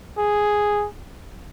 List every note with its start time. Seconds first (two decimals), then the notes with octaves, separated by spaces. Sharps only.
0.18 G#4